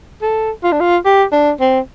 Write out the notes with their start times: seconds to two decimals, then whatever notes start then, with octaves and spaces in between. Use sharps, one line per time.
0.22 A4
0.63 F4
0.72 D4
0.80 F4
1.05 G4
1.32 D4
1.60 C4